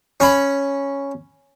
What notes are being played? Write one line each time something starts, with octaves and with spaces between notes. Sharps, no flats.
C#4 C#5 B5